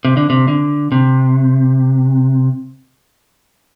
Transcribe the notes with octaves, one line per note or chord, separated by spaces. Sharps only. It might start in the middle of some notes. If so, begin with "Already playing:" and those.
C3
D3
C3
D3
C3